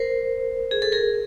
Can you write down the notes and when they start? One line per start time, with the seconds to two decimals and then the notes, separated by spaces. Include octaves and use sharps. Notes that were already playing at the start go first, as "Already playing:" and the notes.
Already playing: A#4 C5
0.71 G#4
0.82 A4
0.92 G#4 A#4